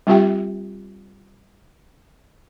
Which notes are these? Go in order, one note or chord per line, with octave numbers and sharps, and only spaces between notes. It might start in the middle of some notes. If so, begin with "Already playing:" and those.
G3 C4 F4 G4 E5 G5